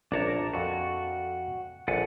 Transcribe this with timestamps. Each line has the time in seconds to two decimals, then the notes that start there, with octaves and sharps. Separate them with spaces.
0.12 A#1 D4 A#4 C#5 A5
0.54 F2 F#4 A4
1.88 A#1 A4 F#5 G#5